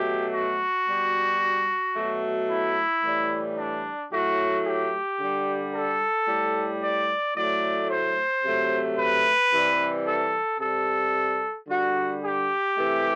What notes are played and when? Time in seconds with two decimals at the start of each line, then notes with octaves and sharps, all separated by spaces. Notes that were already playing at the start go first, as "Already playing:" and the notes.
Already playing: B2 F#3 A3 G4
0.33 F#4
0.88 B2 G3
1.95 B2 F#3 A3
2.50 E4
3.04 A2 E3 G3
3.57 D4
4.11 A2 F#3 A3 F#4
4.66 G4
5.20 D3 G3
5.74 A4
6.28 A2 G3
6.83 D5
7.37 A2 F#3 A3 D5
7.90 C5
8.44 C3 F#3 A3
8.98 B4
9.53 C3 E3 G3
10.07 A4
10.60 C3 G3 A4
11.68 D3 G3 F#4
12.23 G4
12.76 C3 E3 A3